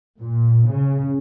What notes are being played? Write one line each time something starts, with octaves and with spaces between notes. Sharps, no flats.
A#2
C#3